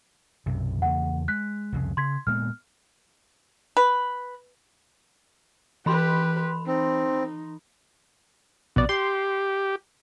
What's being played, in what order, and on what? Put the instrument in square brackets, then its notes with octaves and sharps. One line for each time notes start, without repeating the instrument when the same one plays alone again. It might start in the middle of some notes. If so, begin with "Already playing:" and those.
[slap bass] B1 F#2 C3
[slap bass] E2 C#3 A#3 [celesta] F#5
[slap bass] G#3 [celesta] F#6 B6
[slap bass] C2 F2 C#3
[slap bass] C#3 [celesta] C6 G#6 B6
[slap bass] A#2 G#3 B3 [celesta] F6
[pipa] B4
[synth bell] E3 B5 C6 [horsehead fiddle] G4 B4
[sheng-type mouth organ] C4 [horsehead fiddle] D#4
[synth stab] A#1 D5 [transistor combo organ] B2
[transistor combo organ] G4 [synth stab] C6